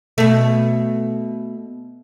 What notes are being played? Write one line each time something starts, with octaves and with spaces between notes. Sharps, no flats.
B2 A3